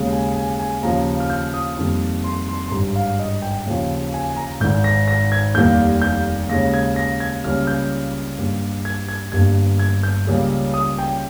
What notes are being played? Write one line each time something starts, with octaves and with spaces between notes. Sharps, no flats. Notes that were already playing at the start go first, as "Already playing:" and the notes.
Already playing: D#2 C#3 G#3
G#5
G#5
G#5
D#2 C#3 F3 A#5
F6
G6
D#6
F2 D#3 G3 A#3
C6
C6
C6
G#1 G2 G3 A#5
F5
D#5
G5
D#2 C#3 F3
G#5
G#5
A#5
G#1 G#2 D#3 G6
A#6
A#6
G#6
F1 D#2 D#3 G3 A#3 G6
G6
D#2 C#3 G#3 A#6
G#6
A#6
G#6
C#2 C#3 G3 A#3 F6
G6
G2 G3 A#3
G#6
G#6
G1 G2 G3 A#3 G#6
G#6
G6
C#2 C#3 G3 A#3
D#6
G5